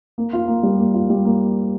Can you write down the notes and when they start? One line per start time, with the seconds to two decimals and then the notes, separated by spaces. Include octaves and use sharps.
0.18 A#3
0.33 F4
0.48 A#3
0.63 G3
0.79 A#3
0.94 F4
1.10 G3
1.25 A#3